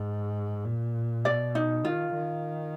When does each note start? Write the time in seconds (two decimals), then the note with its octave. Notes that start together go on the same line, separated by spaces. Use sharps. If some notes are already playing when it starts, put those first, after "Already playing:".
Already playing: G#2
0.65 A#2
1.24 B2 D5
1.55 D#4
1.85 D#3 F4
2.14 D#3